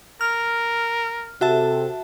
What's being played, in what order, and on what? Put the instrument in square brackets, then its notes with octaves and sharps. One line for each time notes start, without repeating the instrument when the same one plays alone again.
[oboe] A#4 [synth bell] F6
[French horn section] C3 A4 [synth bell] F#4 E5 A5